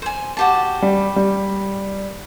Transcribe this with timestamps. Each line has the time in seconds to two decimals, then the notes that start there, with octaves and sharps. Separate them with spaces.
0.02 C5 G#5
0.37 F#4 G4 A5
0.82 G3
1.16 G3